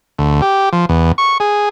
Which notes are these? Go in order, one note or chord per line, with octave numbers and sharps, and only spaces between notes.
D2
G4
F3
E2
C#6
G#4